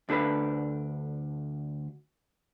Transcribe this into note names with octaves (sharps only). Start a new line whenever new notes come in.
D2 D4 A4 B4